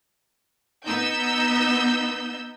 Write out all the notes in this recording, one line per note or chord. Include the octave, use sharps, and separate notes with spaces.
B3 D#4 E6 G6